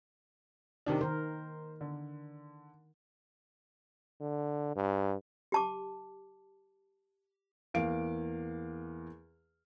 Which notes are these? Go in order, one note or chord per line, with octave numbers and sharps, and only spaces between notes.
C3 D#3 D4
D#3 A#4 C5
D3
D3
G2
G4 A5 D6
E2 A#3 F5 D7